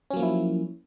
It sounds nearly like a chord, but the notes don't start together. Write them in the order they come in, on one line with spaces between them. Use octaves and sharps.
C#4 F#3 A#3 F3 E4